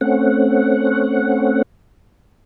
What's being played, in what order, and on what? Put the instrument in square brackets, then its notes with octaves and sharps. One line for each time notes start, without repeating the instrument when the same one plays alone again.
[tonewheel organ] A3 C4 C#4 F#5